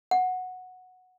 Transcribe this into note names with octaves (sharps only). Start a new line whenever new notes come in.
F#5